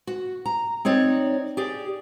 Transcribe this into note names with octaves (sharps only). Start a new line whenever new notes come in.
F#4
A#5
C4 D#4 C#5 D5
G4 G#4 D5